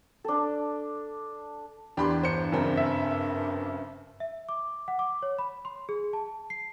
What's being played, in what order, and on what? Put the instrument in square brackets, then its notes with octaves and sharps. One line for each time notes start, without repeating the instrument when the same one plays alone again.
[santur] D4 A4
[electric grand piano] E2 D4 [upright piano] G4 B5 C6
[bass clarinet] G2 [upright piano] C5 C#7
[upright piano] F#2 C#3 C4
[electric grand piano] E5
[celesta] E5
D6
F#5
D6
C#5
B5
C6
G#4
A5
C7